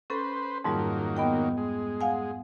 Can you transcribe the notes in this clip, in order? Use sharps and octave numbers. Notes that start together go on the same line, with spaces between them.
C#4 A4 B4 C5
F2 G#2 D#3 F#3 G3 A#3
B3 D#5 G5
G#3
F5 F#5 G#5